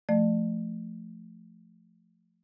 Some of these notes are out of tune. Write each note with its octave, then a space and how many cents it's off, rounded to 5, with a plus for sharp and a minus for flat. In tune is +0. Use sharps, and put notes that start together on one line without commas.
F3 -5 A3 +0 D5 +40